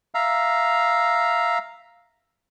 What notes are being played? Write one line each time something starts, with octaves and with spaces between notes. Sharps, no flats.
E5 F5 A#5